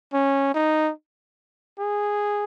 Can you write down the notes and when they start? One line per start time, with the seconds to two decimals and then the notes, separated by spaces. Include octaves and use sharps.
0.13 C#4
0.54 D#4
1.79 G#4